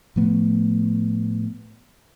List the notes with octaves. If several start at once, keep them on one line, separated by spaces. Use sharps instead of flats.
A2 F3 A3 B3